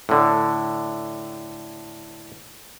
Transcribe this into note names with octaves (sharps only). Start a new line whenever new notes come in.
A2 D3